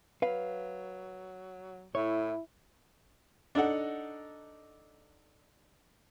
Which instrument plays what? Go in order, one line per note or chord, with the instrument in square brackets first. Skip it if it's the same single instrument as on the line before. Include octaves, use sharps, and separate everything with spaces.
[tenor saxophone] F#3 [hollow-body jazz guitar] B4 F5
[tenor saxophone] A2 [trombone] E4 [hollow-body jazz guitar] C#5
[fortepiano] D4 D#4 A4 F#5